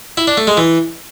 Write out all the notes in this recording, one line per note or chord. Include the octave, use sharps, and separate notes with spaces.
E4
D4
A3
G#3
E3